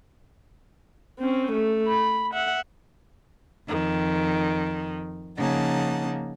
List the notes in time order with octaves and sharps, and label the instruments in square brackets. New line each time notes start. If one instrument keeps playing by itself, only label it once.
[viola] C4 C#4
A3
B5
E5 F#5
[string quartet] F2 D#3
C#3 F3 A#3 D#4 F#5 A5